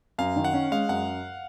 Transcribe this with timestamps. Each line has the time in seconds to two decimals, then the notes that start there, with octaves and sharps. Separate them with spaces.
0.18 F#2 F5
0.36 D#3
0.44 F#5
0.53 C#4
0.71 G#3 F5
0.89 F#2 F#5